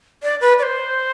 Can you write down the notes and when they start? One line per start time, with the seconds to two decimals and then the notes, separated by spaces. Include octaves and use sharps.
0.23 D5
0.41 B4
0.59 D5
0.63 C5